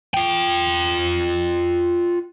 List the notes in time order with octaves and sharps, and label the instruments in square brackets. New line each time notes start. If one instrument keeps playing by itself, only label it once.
[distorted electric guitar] F4 G5